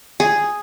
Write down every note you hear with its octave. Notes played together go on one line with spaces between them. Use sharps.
G#4